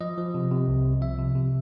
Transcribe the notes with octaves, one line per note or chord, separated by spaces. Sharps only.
F3 D#5
F3
C3
C3
C2
C2
F3 E5
C3
C3